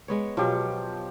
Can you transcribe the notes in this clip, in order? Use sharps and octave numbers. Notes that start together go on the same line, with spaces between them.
G#3 B3 C#5
B2 F3 F#3 G4 F5